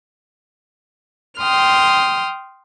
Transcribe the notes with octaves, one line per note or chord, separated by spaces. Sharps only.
G5 C6 D#6 F6